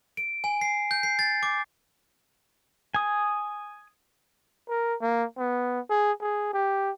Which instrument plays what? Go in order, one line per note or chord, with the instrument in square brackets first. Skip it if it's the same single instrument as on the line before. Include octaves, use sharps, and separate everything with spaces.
[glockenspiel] D7
G#5
C7
G6
C7
A6
D6
[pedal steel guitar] G#5 D#6
[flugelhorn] A#4
A#3
B3
G#4
G#4
G4